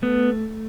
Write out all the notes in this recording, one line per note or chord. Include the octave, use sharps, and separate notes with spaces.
A3 B3